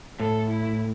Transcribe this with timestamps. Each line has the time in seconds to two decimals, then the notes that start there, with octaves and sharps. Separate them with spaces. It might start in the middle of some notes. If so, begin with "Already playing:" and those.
0.20 A2 A4
0.49 E4